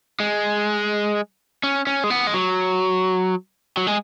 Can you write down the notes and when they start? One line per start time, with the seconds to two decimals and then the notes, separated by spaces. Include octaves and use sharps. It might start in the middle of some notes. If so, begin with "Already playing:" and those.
0.20 G#3
1.64 C#4
1.87 C#4
2.04 G#3
2.10 B3
2.27 G#3
2.34 F#3
3.77 F#3
3.87 G#3